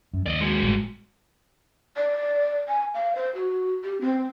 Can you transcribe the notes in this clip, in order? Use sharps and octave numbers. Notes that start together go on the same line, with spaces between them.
F#2
D#2 D5 D#5
G#3 F#4
G#1 A2 G3
D5
G#5
F5
C5
F#4
G4
C4